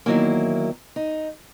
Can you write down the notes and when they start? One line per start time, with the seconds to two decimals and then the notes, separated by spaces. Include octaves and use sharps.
0.06 E2 D#3 F#3 A#3 E4
0.96 D#4